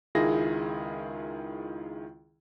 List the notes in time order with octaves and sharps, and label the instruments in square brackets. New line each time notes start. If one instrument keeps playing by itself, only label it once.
[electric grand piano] C#2 D#3 E4 F4 G#4 A#6